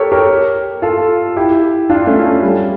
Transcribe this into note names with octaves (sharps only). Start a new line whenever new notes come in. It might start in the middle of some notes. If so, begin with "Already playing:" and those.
Already playing: G4 A4 A#4 C#5
G4 A#4
F4 A4
E4 G4
D4 F4
A3 C#4
A3
G3